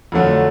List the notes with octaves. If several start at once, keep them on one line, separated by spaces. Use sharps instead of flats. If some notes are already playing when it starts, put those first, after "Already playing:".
F2 D3 F#3 A3